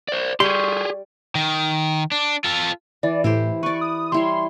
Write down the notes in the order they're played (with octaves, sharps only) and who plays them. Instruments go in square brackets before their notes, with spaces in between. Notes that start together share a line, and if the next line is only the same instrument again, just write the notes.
[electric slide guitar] C5 D5
[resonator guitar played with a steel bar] G3 [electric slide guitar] G4 G#4 [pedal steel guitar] C6 C#6
[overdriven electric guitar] D#3
D4
F4 A4
[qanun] E3 [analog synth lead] D5
[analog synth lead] A2 [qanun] E4 G4 C5
[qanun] B4 D5 [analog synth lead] C#6
[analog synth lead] D#6
[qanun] G3 E4 C#5 [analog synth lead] C6